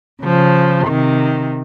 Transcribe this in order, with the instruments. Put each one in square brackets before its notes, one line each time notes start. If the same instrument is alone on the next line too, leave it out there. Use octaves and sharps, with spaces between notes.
[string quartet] C#3 F3
C3 D#3